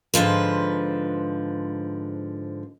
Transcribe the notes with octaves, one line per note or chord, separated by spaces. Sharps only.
G#2 D3 F3 B4